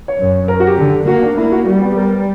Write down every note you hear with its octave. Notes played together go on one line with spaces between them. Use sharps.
C#5
F#2
A#4
F#4
G4
D3
A#3 F#4
D4
A#3 E4
F#4
G3 F#4
B3
G4
G3 A#4
B4